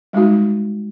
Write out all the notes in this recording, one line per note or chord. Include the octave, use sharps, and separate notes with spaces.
G3 G#3 D#4 F#4